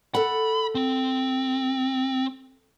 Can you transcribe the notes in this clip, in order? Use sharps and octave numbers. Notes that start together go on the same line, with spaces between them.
A4 F#5 B5
C4